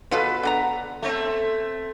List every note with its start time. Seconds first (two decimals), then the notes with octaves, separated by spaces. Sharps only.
0.11 B2 F4 A4 B4
0.43 D3 B3 A#5
1.02 A3 C4